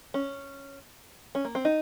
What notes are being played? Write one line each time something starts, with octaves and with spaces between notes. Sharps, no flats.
C#4
C#4
A#3
C4
D#4